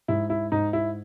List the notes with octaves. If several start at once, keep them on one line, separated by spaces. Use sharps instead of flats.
G#2 E4
E4
G#2 D#4
E4